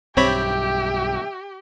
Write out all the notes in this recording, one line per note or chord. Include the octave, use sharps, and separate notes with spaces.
B1 G2 C4 G4 C#5 E5 G5 B5